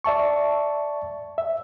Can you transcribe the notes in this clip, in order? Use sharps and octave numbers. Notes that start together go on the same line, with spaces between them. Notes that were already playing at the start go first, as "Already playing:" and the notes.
D5 E5 A5 C#6
E5